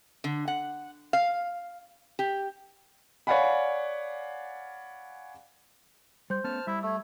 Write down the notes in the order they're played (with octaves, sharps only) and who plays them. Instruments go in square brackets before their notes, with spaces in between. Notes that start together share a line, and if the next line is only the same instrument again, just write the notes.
[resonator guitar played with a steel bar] D3
F#5
F5
G4
[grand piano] C#5 D5 F5 F#5 G#5 B5
[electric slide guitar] G3 [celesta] C5 C6 G6
[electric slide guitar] A3 B3 C#4 [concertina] A5 F6
[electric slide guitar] G3 [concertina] E4 E5
[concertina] A3 [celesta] E6 G#6